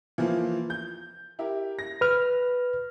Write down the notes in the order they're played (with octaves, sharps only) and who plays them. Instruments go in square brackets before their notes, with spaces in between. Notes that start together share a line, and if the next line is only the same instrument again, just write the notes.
[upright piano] E3 F3 A#3
G6
E4 G4 A#4
A#6
[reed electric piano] B4 F6